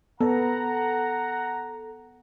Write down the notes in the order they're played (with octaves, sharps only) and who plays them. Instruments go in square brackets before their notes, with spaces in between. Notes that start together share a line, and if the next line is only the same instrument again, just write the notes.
[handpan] B3 [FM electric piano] A4 [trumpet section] F#5 A#5